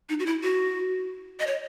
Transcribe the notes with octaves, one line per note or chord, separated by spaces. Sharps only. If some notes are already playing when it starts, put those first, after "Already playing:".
D#4
F#4
E4
F#4
D#5
C#5